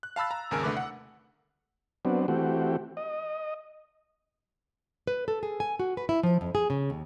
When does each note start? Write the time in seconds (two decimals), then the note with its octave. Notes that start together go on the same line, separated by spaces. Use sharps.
0.03 F#6
0.16 F5 A5 B5 E6 A6
0.31 A#5
0.51 G#1 D#2 C#3 G#4 A#4 G#5
0.63 C2 D3 A3 B4 D6
0.77 F#5
2.05 F#3 B3 C4 D4
2.28 E3 A3 C4 F#4 G4
2.97 D#5
5.07 B4
5.28 A4
5.43 G#4
5.60 G#5
5.80 F#4
5.97 B4
6.09 E4
6.23 F3
6.41 F2
6.55 G#4
6.70 C#3
6.90 D#2